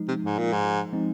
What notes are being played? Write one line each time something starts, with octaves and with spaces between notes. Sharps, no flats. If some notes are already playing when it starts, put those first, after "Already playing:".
Already playing: F3 G#3 D#4
C3
G#2
A#2
G#2
F3 G#3 C4 D#4